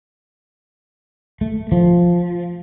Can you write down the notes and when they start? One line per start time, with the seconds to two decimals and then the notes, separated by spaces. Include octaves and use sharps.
1.41 A3
1.72 F3